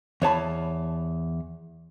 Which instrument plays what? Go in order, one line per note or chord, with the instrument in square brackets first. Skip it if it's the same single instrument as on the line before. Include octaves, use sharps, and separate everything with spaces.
[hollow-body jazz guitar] E2 C#5 A5 B5